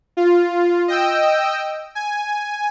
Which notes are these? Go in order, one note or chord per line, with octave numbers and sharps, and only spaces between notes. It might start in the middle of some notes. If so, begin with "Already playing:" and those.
F4
D#5 G5 E6
G#5